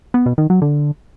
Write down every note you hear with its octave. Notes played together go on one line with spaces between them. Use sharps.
B3
B2
D#3
F#3
D3